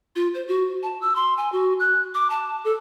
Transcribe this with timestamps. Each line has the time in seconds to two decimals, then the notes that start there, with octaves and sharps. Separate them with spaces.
0.16 F4
0.34 C5
0.48 F#4
0.83 A5
1.01 E6
1.16 C6
1.37 G#5
1.52 F#4
1.80 F#6
2.14 D6
2.30 A5
2.64 A4